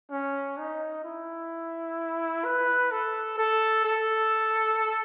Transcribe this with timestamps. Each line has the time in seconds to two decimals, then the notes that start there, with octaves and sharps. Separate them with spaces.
0.10 C#4
0.57 D#4
1.04 E4
2.44 B4
2.91 A4
3.37 A4
3.84 A4